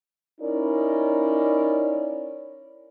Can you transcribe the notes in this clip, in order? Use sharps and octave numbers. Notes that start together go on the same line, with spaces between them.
C#4 D#4 E4 A#4 D5